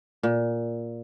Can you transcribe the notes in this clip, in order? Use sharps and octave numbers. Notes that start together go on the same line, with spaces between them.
A#2